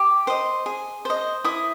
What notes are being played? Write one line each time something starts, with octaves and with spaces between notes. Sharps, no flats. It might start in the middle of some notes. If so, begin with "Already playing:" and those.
Already playing: G4 D6
C5 D#5
G#4
C5 D#5
E4 D#6